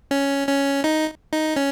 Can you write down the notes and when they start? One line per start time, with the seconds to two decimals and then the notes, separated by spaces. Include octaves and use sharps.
0.11 C#4
0.48 C#4
0.84 D#4
1.32 D#4
1.56 C#4